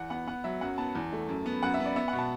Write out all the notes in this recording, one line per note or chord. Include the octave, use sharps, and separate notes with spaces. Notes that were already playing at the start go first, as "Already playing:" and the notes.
Already playing: E2 F#5
B3 F#5
B3 F#5
F#3 E5
F#2 F#5
B3 A5
E2
A3
F#2
B3
F#2 F#5
E5
B3
D5
B3 E5
B2 F#5
A5